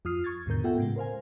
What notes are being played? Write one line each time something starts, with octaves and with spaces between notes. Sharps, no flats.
F2 F4 D#6 F6 C7
C#6 G#6 A6
D#2 G#2 B2 D3 A#4 G6
B3 F4 A4 E5 F#5 G5
A2 C#3 G#3
A#4 C5 F5 G#5